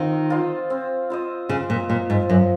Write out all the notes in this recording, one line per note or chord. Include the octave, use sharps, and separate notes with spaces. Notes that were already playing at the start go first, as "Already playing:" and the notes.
Already playing: D#3 C4 F4 C5 D#5
F4 C5 D#5
C4
F4 C5 D#5
C#3 C4
A#2
A#2 F4 C5 D#5
G#2
F#2 F3